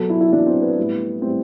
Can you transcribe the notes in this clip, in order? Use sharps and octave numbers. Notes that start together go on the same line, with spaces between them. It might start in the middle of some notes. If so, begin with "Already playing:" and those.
Already playing: B2 F#3 A4
E4
E4
B2 F#3 D4
C4
B3
A2 G3
A2 G3 C4